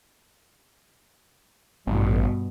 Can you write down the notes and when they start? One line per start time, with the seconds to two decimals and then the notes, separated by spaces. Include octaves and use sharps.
1.87 A1 G2 B2